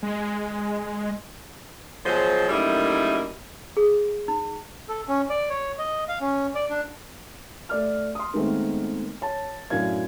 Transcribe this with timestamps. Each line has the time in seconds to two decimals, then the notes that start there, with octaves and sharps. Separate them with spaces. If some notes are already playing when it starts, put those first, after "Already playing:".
0.03 G#3
2.06 B2 F3 F#3 G#3 G#4 C5
2.49 F#2 G3 A3 A#3 D#4 E4
3.77 G#4
4.28 D#4
4.88 A4
5.08 C#4
5.30 D5
5.50 C#5
5.78 D#5
6.08 F5
6.21 C#4
6.55 D5
6.70 D4
7.69 A3 D5 F6
8.15 C6 D#6
8.34 D#3 G#3 A3 B3 C4
9.21 C#5 A5
9.70 F#2 A2 D4 F5 G#6